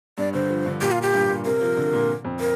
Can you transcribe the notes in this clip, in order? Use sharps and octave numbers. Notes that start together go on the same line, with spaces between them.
G2 D5
D3 C5
F3
D3
A#2 G4
F4
G4
G2
A#2
C3 A#4
F3
D3
A#2
F2
A#4